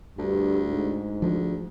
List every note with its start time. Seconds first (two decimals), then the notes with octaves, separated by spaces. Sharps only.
0.18 D2 G2
0.70 G#2
1.22 D2 F3